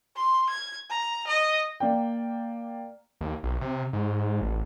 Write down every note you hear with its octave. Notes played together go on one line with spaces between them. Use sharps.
C6
G#6
A#5
D#5
A#3 D5 G5
D#2
B1
C3
G#2
A1